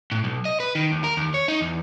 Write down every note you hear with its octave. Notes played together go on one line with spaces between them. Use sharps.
A2
B1
D#5
B4
D#3
D#2
A#4
D#2
C#5
D#4
E2